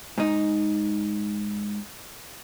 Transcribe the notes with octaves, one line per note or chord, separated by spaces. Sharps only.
G#2 D#4